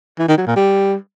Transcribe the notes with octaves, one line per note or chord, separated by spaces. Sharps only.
E3
D#3
F#3
A#2
G3